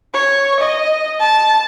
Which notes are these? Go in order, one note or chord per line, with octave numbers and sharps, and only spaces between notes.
C#5
D#5
A5